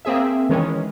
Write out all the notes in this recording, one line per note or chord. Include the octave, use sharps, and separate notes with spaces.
A#3 C4 G#4 E5
D#3 E3 G#3 C#4